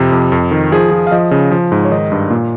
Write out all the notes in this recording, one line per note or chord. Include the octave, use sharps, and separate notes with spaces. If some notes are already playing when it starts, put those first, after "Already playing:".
Already playing: F2 C3
F2
F2
D#3
F3 G#4
F3
F5
F3 D#5
C#3
F3
G#2
C#5
D#3 D#5
G2
A#2